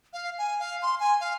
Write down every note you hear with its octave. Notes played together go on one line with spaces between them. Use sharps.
F5
G#5
F5
C6
G#5
F5